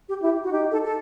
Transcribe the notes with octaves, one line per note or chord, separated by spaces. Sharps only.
G4
E4 G4
F#4
D#4 G4
A4
A4